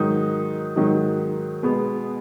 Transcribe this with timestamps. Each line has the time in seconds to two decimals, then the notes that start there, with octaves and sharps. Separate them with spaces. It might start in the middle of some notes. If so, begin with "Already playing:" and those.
Already playing: G#2 D#3 F#3 D#4
0.76 G#2 D#3 F#3 D#4
1.63 B2 G#3 B3